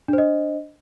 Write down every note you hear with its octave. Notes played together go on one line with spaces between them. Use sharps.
D4 C5 D#5